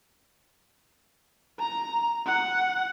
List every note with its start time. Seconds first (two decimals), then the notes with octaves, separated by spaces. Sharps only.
1.59 A#5
2.26 F#5